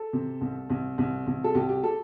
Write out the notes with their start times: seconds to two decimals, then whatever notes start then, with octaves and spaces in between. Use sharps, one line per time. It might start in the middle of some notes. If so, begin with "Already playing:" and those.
Already playing: A4
0.13 C3
0.41 C2
0.70 C2
0.98 C2
1.27 C2
1.44 A4
1.55 C2 G4
1.69 G4
1.83 A4